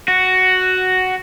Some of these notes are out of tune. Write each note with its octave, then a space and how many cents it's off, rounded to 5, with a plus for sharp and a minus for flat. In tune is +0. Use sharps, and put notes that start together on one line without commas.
F#4 +5